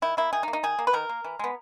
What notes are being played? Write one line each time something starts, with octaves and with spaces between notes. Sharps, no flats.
D#3 E4
A#3 E4
D#3 G#4
D#4
A#3
D#4
D#3 G#4
A#3
B4
D#3 A#4
A#3
E3
G#3 B3